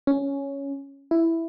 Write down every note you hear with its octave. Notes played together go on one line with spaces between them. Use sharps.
C#4
E4